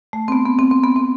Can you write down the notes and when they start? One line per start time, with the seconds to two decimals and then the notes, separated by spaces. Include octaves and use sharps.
0.13 A3
0.28 C4
0.32 B3
0.46 B3
0.59 C4
0.71 C4
0.84 B3
0.96 C4